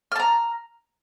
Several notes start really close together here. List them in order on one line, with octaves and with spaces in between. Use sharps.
F6 A5 A#5